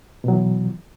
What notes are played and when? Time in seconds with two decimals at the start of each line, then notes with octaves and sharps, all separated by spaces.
0.24 B2
0.28 F#3
0.33 E3